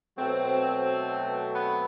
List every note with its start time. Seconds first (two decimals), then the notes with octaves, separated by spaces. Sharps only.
0.17 B2 F#3 A3 C4
1.54 B3